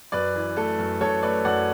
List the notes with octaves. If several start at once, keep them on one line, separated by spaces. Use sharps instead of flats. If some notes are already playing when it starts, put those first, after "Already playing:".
F#2 B4 D5
E3
A3 A4
F#2
F#2 A4 C#5
A3 B4 D5
F#2 D5 F#5